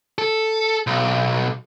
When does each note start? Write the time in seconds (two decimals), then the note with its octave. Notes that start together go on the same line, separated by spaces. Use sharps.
0.18 A4
0.87 B1